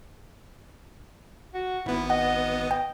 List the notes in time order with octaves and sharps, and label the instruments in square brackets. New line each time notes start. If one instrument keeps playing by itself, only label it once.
[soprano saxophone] F#4
[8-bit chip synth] G#1 B3 [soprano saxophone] E4
[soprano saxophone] D#5 [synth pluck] F#5
[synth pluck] G5